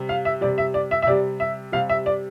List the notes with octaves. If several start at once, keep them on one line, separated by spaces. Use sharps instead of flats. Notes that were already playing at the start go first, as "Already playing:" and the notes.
Already playing: C3 G3
F5
E5
C3 G3 D5
E5
D5
E5
E5
C3 G3 D5
E5
C3 G3 F5
E5
D5